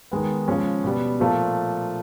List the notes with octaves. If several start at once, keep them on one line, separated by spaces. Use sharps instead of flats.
D#3 G#3 B3
C#3 F3 G#3 C#4
B2 G3 B3
A#2 F3 A3